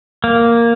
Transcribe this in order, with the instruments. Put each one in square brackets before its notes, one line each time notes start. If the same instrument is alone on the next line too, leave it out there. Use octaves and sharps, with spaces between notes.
[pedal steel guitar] A#3